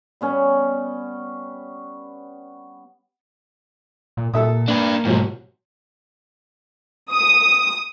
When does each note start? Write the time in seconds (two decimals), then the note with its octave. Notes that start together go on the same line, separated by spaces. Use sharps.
0.21 G3 B3 C#4
4.17 A#2
4.34 A#2 A4 E5 D#6
4.68 A#3 D4 B4
5.05 G#2 B2 F3 F#3 G4
7.12 D#6